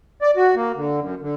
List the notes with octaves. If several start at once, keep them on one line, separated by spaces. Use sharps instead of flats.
D5
F#4
A#3
D3
F#2
D3